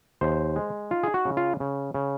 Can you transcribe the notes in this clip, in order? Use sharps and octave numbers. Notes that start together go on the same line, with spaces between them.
D#2 C5
G#3
D#4 F4
G#4
F#4
C#3
F4
C#3
C#3